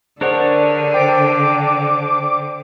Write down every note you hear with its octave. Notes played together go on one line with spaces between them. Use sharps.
D3 D4 G#4 A#4 C5 C#5 F#5
C5 G5 D6